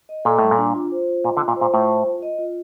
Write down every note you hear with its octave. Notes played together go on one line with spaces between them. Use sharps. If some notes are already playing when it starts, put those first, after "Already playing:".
D#5
A#2 A4
A2 G3
A#2
D4
F4
C5
F4
A#2 D#5
D3
F4
A#2
C5
A#2
A2 F4
C5
F4
D#5
F4